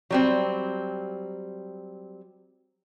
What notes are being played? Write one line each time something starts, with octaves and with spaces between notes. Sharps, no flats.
F#3 G3 C4